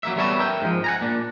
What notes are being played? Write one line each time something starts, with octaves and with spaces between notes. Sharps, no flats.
F#3 A#3 E5
G3 B3 A4 C#5 D5 E5
A#4 E5 G5
G#2 F3
F#5 G#5 A#5
A#2 D4